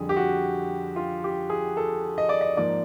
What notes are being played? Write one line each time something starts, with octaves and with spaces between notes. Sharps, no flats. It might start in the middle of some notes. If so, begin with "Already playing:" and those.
Already playing: F2 D3 G3 G#4
G4
F#4
F4
G4
G#4
A4
D#5
D5
D#5
G#2 F3 A#3 D5